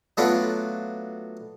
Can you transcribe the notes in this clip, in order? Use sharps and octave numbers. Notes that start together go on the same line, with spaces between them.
F#3 A3 B3 D4 F4 F#4